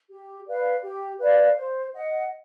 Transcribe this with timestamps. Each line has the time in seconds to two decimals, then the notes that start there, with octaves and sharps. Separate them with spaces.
0.10 G4
0.47 B4 D5 F5
0.83 G4
1.20 B4 D5 F5
1.57 C5
1.94 D#5 F#5